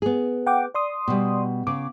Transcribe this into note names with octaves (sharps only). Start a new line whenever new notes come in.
B3 G#4
F#5 G5 D6
D5 C6 D#6
B2 G3
C#3 D6